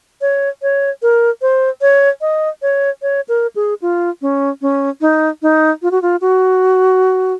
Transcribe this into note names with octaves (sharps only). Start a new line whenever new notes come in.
C#5
C#5
A#4
C5
C#5
D#5
C#5
C#5
A#4
G#4
F4
C#4
C#4
D#4
D#4
F4
F#4
F4
F#4